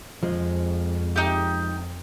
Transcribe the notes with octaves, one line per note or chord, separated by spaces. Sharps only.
F2 F3 G#3
D#4 G4